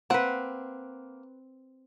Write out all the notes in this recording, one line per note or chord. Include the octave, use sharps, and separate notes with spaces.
A#3 C4 B4 F#5